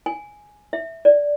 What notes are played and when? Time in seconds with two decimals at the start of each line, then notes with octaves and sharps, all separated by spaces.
0.06 G#5
0.73 E5
1.05 D5